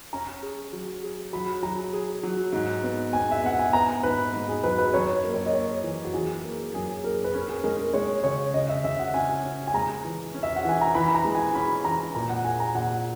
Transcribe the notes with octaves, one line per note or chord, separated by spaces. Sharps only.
C#4 A#5
G#4
F#3
G#4
F#3 B5
F#3 A#5
G#4
F#3
G#2
B3
B3 G#5
E5
B3 F#5
G#5
B3 A#5
G#2 B4
G#2
G#4
F#3 B4
B4
F#2 C#5
A#3
C#5
D#5
A#3 C#5
E3
F#4
E3 G#4
A#3
F#2 G#4
A#3 A#4
B4
C#4 A#4
G#4
G#3 A#4
A#4
G#3 C#5
C#3 C#5
C#3 D#5
E5
C#3 E5
F#5
C#4 G#5
C#4
G#5
G#3 A#5
E3
C#4
E5
F#5
E3 G#5
A#5
E3 B5
A#5
G#3
G#5
C#4 B5
E3 A#5
A#2 A#5
F#5
A#3 G#5
A#5
A#2 F#5